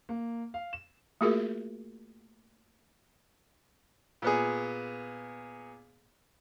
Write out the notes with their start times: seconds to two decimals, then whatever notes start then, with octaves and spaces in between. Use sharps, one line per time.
0.09 A#3
0.54 F5
0.73 E7
1.21 A3 A#3 F4 F#4 G#4 A#4
4.22 A#2 B3 G#4